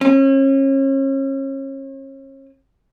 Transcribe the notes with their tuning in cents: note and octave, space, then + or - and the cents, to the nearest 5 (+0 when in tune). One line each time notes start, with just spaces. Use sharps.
C#4 -35